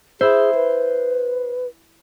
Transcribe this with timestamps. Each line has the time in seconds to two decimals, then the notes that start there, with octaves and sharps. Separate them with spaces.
0.21 E4 G#4 C5 E5
0.55 B4